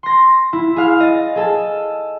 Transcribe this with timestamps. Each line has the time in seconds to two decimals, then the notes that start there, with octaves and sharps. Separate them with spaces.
0.03 C6 A#6
0.53 E4
0.76 G#4 F5 F6
1.00 D#5 A6
1.35 G#4 A4 A5